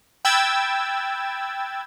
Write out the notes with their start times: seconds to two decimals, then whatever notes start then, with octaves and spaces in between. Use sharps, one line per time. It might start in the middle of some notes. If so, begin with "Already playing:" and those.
0.25 G5 B5 E6 F#6 G#6 A6